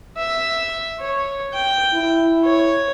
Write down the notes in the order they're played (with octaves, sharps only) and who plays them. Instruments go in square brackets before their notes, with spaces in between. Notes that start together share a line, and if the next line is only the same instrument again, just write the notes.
[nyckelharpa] E5
C#5
G5
[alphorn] E4
[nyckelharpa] C#5